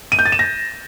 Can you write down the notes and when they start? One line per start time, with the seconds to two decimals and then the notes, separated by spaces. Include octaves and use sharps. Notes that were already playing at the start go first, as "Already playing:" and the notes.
0.12 D#7
0.19 G6
0.25 A6
0.32 E7
0.39 A#6